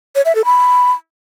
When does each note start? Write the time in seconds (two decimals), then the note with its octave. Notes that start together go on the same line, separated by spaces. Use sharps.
0.15 C#5
0.25 E5
0.35 A4
0.45 B5